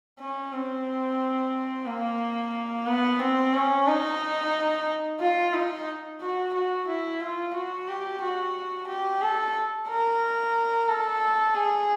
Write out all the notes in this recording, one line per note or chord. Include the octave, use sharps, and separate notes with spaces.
C#4
C4
A#3
B3
C4
C#4
D#4
F4
D#4
F#4
F#4
E4
F4
F#4
G4
F#4
G4
A4
A#4
A4
G#4